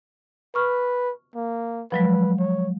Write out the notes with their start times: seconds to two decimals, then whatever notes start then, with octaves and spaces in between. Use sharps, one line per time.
0.55 B4 C#6 F6
1.35 A#3
1.92 F3 F#3 G#3 B4
2.39 C#5